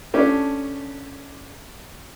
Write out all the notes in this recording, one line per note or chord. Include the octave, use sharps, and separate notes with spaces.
A3 C#4 D4 G4